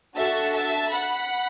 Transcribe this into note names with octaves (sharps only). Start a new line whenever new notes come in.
D4 F#4 A4 E5 A5
E5 A5
F#5 B5